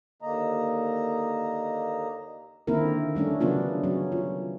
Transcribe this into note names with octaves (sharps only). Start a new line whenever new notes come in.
D#2 D3 A#3 D#5 A#5
D3 D#3 A#3 C4 E4 A#4
G3 A3 C#4 D4
C#3 F#3 B3 D4 F4
F#3 C#4
F4